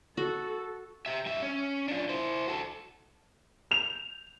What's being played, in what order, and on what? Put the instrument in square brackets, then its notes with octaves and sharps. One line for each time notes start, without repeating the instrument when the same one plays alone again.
[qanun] F#4 [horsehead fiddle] A4
[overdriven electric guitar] G4 E5
G2 E5
C#4
D4 F4
E4 C5
F#4 A4
[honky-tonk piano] G6 F7